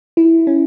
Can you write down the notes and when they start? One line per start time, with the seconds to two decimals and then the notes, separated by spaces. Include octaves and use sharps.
0.17 E4
0.47 C#4